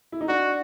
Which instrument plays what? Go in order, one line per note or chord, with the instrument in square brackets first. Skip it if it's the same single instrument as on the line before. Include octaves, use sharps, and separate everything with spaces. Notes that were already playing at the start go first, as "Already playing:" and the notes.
[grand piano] E4
D#4
[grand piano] D4 [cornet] F#4